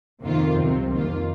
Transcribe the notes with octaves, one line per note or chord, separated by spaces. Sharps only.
F2 C3 D#3 A#3 F4
C2 C3 F#3 C4
F2 D#3 A#3 F4